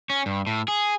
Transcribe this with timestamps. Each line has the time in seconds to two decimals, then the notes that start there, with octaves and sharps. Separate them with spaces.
0.10 C#4
0.26 G2
0.47 A2
0.68 G#4